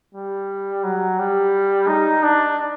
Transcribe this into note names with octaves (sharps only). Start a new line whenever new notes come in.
G3
F#3
G3
D#4
D4